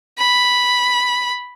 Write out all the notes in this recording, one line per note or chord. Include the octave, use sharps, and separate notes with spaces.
B5